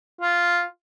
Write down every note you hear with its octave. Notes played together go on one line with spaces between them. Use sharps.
F4